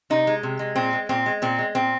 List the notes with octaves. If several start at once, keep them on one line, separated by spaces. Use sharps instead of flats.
C3 D#4
G#3
C3
G#3
A#2 C4
G#3
A#2 C4
G#3
A#2 C4
G#3
A#2 C4